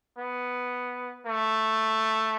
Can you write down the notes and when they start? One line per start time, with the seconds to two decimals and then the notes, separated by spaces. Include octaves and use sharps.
0.18 B3
1.27 A3